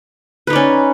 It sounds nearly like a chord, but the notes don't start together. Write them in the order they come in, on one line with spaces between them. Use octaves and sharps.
B4 D#4 D5 C#4